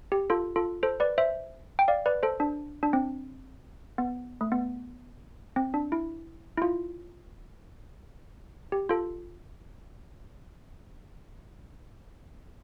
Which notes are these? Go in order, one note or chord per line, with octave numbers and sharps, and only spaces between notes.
G4
F4 A4
F4 A4
A4 C5
B4 D5
C5 E5
G5
D5 F5
B4 D5
A4 C5
D4
D4
C4
B3
A3
B3
C4
D4
E4
E4
F4
G4
F4 A4